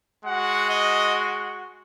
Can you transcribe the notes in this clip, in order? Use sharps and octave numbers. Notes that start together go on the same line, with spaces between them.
G#3 F#4 F#5
D#5